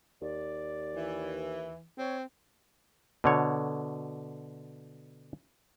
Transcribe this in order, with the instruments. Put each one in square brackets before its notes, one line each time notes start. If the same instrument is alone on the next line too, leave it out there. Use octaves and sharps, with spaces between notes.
[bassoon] D#2 [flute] D5
[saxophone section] E3
[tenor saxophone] C4 [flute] C#5
[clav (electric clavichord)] B2 D3 C#5